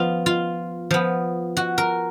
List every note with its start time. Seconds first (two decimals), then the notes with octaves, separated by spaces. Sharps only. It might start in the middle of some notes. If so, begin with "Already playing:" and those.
Already playing: F3 B3 F4
0.26 F4
0.91 F3 B3
1.57 F#4
1.78 A#4